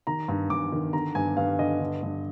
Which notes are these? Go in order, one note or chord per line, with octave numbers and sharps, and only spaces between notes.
D#3 A#5
G2
G2 D6
D#3
D3 A#5
G2 G#5
G2 F5
D3 D#5
D3
G2